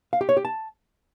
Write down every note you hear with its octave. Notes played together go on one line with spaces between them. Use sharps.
F5
G4
C#5
G4
A5